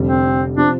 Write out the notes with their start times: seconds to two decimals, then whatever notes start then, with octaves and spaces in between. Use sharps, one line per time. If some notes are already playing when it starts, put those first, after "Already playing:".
Already playing: F1 F2 D3 G3
0.08 C4
0.57 C3 F3 C4 D4